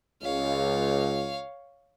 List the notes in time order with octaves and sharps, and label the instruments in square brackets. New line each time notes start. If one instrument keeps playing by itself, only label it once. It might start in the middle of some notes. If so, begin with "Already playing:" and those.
[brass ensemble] C#2 [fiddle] C#5 F5